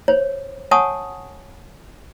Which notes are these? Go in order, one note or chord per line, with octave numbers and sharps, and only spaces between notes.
C5 C#5
C#5 F#5 G#5 A5 C#6 D#6